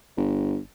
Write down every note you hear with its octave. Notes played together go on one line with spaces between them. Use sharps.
G1